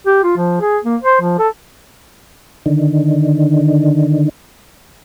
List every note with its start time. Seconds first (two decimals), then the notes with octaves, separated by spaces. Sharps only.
0.06 G4
0.24 F4
0.37 F3
0.61 G#4
0.85 A#3
1.02 C5
1.22 F3
1.39 A4
2.66 D3 D#3